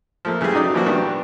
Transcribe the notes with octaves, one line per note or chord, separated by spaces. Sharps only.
F3 A3 A#3
C#3 E3 G3 G#4
F#3 D#4 D5 D#6
A#2 C#3 E3 F3 A#3 F#4
D#3 G3 B3 D4